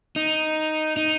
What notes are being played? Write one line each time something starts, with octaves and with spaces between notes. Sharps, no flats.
D#4
D#4